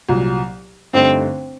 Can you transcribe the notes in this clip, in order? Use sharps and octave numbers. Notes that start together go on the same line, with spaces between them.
C2 A#2 F#3
G1 G2 D3 A3 C4 D#4